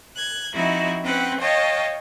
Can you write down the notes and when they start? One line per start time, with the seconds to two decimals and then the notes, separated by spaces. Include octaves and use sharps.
0.15 F#6 G#6
0.52 F3 C4 D#4 E4 F#4
1.03 C4 C#4 B4 F#5 G5
1.40 C#5 D#5 F5 G5 A5